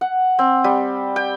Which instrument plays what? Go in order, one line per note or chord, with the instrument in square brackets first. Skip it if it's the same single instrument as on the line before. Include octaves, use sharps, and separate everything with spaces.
[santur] F#5
C4
G3
G5